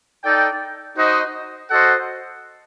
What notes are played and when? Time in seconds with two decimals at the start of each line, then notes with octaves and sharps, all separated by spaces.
0.24 D#4 A4 D5 G5
0.97 D#4 F#4 C5 D#5
1.70 F#4 A4 C5 D#5 F#5